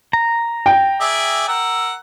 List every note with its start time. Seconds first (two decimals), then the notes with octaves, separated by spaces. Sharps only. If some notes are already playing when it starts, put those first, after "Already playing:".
0.13 A#5
0.66 G5
1.00 G#4 D5 E5
1.48 A#4 F#5 E6